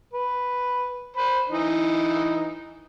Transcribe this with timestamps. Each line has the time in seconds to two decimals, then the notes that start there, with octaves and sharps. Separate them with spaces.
0.13 B4
1.17 C5 B5
1.49 E3 D#4